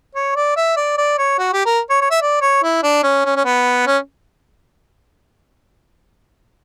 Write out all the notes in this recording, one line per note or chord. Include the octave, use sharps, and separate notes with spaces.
C#5
D5
E5
D5
D5
C#5
F#4
G4
A#4
C#5
C#5
E5
D5
C#5
E4
D4
C#4
C#4
C#4
B3
C#4